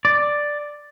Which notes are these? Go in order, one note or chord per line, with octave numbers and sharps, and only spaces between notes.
D5